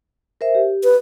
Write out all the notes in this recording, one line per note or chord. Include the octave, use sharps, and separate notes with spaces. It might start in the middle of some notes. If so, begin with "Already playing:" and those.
A#4 C5 E5
G4
B4